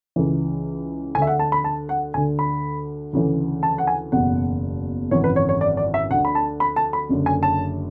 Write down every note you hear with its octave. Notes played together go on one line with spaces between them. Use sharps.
C#2 C#3 E3
D2 D3 E5 G#5
F#5
A5
B5
A5
F#5
D2 D3 G#5
B5
D2 C#3 E3
A5
F#5
G#5
F#1 E2 B2 F#5
G#1 F#2 C#3 E3 C#5
B4
C#5
C#5
D5
D5
E5
D2 D3 F#5
B5
A5
B5
A5
B5
F#1 F#2 D3
G#5
A5